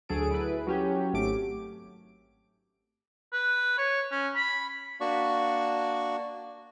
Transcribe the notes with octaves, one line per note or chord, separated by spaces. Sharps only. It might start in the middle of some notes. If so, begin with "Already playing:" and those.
D2 F#3 G#4 A4 D7
E4 B4
F#3 C#4 G4
G#1 A3 D6 D7
B4
C#5
C#4
B5
A#3 D4 F#4 D5 C#6